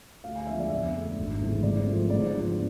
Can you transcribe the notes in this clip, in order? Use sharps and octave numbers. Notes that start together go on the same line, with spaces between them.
D2 F5
G#5
D3 F3 G#3 B3 E5
D5
F2 E5
D3 A3
G#1
G#2 E3 A3 C4
G#2 D5
F3 A3 C4
G#2 D5
F3 B3 D4